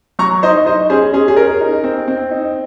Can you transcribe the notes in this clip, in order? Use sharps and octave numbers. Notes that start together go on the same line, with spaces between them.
F#3 A#5 C#6
D#4 C5 D#5
D#4 C5 D#5
C#4 G#4 C5
C#4 G#4
G#4
C#4 A#4
D#4
C4
C4
D#4